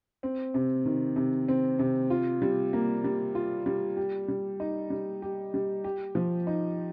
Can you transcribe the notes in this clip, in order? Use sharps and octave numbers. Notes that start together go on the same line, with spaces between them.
C4
C3
D#3
C3
C4
C3
F4
G3
A#3
G3
F4
G3
G4
G3
D#4
G3
G4
G3
G4
F3
D#4